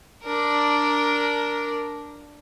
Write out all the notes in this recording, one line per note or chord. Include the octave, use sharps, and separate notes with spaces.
D4 A#4